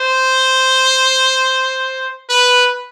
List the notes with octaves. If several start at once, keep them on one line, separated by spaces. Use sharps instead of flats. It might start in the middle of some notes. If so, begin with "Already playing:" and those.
Already playing: C5
B4